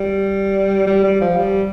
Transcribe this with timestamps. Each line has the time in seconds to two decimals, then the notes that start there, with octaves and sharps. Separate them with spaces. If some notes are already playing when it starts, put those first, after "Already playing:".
Already playing: G3
0.87 G3
1.03 G3
1.21 F3
1.37 G3